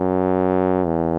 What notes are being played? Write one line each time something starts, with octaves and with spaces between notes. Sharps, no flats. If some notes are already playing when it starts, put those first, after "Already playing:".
Already playing: F#2
E2